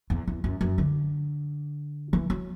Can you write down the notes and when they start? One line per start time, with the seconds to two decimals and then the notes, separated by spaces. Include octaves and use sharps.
0.10 E2
0.28 E2
0.44 F#2
0.61 F#2
0.78 D3
2.13 E3
2.30 F#3